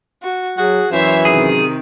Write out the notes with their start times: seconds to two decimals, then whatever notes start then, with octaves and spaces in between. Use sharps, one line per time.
0.22 F#4
0.58 F#3 F#4 G#4
0.92 F#2 E3 C5 C#5 E5
1.25 C3 D#3 G#4